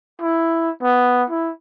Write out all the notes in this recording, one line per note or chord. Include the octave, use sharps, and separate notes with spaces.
E4
B3
E4